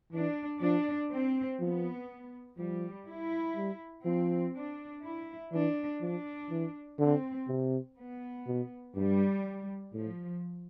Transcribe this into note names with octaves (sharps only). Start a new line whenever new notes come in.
E3 D4
F3 D4
C4
F3 B3
F3 G3
E4
G3
F3 C4
D4
E4
E3 D4
F3 D4
E3
D3 C4
C3
B3
B2
G2 G3
A2 F3